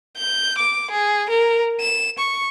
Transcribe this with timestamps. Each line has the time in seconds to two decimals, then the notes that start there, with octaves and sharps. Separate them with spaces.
0.17 G6
0.58 D6
0.91 G#4
1.30 A#4
1.80 E7
2.19 C#6